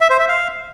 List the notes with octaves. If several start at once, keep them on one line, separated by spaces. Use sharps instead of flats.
E5
C5
E5
F5